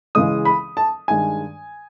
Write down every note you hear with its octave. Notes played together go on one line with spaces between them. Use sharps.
C#2 C#3 E3 G#3 D#6
B5
A5
G2 D#3 G#3 G#5